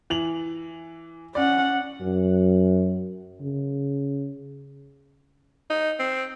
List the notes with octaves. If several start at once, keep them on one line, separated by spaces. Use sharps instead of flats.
E3 F7 F#7
C#4 D5 F#5
F#2
C#3
D#4
C4